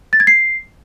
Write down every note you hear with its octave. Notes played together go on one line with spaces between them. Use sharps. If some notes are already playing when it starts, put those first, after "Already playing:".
A6
G#6
C7